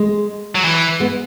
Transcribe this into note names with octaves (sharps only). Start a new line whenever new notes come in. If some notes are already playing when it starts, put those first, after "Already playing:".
Already playing: G#3
F#3
E3
G#3 B3